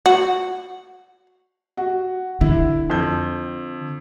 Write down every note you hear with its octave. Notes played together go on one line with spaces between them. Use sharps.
F#4
F#4
D3 E4
F2 G6